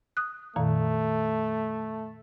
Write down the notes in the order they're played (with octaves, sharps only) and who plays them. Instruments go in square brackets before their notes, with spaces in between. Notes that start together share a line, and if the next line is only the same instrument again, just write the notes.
[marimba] D#6 F#6
[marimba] F2 A#2 D#3 [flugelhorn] A3